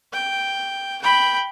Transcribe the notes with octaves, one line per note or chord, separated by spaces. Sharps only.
G5
G5 B5